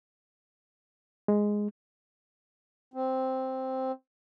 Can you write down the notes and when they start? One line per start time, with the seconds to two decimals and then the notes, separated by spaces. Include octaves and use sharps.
1.28 G#3
2.94 C4